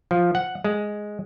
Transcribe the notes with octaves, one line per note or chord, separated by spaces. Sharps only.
F3
F#5
G#3